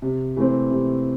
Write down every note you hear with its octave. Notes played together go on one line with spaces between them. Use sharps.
C3
E3 A3 C4
C3